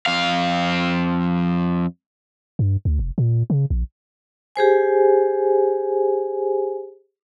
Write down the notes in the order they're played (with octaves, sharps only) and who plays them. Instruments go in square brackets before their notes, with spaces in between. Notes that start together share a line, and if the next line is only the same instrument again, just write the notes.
[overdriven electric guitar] F2 F5
[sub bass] G2
D2
F1
A#2
C#3
A#1
[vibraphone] G4 G#4 C5 G#5